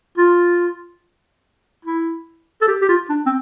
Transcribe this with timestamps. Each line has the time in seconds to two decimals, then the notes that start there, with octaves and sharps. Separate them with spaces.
0.18 F4
1.85 E4
2.62 A4
2.67 G4
2.81 G4
2.89 F4
3.09 D4
3.26 C4